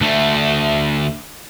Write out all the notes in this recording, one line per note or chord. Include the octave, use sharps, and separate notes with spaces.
D2 A3